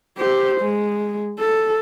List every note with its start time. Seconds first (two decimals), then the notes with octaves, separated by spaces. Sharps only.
0.18 G4 C5
0.61 G#3
1.39 A4